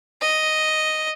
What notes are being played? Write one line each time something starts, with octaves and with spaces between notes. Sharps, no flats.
D#5